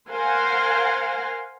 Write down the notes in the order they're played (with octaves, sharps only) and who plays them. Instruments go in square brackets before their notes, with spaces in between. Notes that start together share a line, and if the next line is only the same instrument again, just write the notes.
[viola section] A#4 C5 F5 F#5 G#5